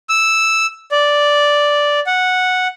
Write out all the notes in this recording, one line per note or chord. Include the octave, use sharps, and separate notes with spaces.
E6
D5
F#5